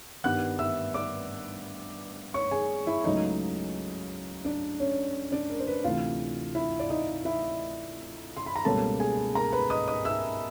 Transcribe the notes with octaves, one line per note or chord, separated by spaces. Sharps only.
G2 D#3 G3 B3 F#5 F#6
E5 E6
D5 D6
C#5 C#6
G#4 G#5
E4 E5
C#2 C#3 F#3 A3 D#4 D#5
D4 D5
C#4 C#5
D4 D5
A#4
C5
B4
D2 C3 E3 F4 F5
E4 E5
D5
D#4 D#5
E4 E5
C6
B5
A#5
C#2 B2 G3 A#3 C#4 A4 A5
G#4 G#5
A#4 A#5
B4 B5
D#5 D#6
D#5 D#6
E5 E6